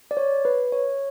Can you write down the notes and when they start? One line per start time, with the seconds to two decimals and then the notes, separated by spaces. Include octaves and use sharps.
0.11 D5
0.17 C#5
0.45 B4
0.72 C#5